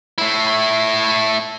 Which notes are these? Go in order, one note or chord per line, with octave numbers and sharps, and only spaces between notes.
A3 E4